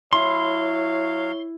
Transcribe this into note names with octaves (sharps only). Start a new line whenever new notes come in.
F#3 E4 C#5 F5 C6